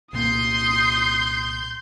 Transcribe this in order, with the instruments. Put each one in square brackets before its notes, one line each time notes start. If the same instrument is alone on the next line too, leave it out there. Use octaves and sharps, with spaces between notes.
[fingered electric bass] C2 A#2 A#3 [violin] C6 G6 [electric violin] D#6 C7